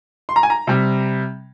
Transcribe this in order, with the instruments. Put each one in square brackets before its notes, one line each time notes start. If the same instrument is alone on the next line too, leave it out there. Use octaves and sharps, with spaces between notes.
[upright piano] C6
A#5
G#5
A#5
C3 G3